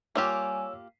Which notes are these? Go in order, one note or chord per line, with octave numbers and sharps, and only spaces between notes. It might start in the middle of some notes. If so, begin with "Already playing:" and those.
G3 A#3 F4 G4 C#5 G#5 E6